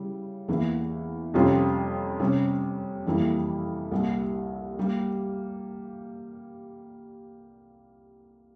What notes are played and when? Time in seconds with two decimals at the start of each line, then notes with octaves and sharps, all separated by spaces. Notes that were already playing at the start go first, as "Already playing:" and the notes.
Already playing: C#3 G3 E4
0.48 E2 E3 A#3
1.34 F2 C3 G3 C#4 F4
2.20 C3 G3 C#4
3.06 F2 E3 G3 A#3 E4
3.92 C2 A#2 G3
4.79 G3 A#3